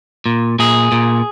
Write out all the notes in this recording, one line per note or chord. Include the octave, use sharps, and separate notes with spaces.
A#2
A#2 G#4
A#2